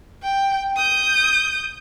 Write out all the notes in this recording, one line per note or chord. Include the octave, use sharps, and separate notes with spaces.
G5
D#6 G6